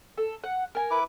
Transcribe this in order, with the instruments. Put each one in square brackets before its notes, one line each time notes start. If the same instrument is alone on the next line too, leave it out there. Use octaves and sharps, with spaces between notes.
[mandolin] A4
F#5
A#4 G#5
[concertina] E4 B4 D6